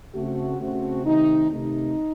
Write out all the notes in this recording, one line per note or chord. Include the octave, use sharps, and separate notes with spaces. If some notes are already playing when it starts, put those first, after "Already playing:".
C#3 A3 C4 F#4
C#3 A3 C4 F#4
C3 D#3 A3 C4 D#4
C3 D#3 A3 D#4